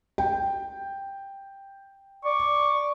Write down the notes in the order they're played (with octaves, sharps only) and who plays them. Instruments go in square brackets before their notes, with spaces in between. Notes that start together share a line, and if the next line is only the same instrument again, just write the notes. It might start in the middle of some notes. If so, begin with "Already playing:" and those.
[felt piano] G5
[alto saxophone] D5 [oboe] C#6